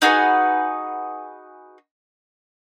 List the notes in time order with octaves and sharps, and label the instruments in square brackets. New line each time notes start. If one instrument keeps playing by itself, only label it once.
[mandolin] D#4 F#4 G#4 B4